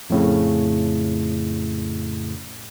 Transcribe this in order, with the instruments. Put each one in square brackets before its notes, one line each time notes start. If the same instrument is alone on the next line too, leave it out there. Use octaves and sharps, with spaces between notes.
[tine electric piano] F2 A2 C#3